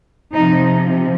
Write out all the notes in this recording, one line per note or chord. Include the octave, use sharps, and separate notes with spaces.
C3 F3 D#4